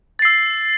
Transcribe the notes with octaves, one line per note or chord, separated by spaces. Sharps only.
E6 A6 C7